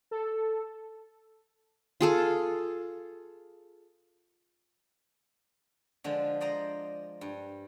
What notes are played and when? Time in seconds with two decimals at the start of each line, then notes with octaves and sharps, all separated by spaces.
0.11 A4
2.01 F4 G#4 A4
6.04 D3 F3 G#3
6.40 C5 D5 D#5 A#5
7.21 G2